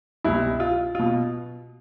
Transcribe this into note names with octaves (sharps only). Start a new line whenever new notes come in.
C2 B2 E4
F4
B2 F4